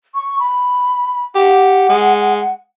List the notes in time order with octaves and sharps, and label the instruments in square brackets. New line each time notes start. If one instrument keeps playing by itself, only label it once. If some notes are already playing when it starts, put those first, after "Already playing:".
[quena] C#6
B5
[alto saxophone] G4 [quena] F#5
[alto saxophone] G#3